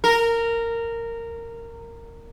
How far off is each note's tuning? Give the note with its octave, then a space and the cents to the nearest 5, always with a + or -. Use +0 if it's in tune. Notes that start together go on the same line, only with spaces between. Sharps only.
A#4 -15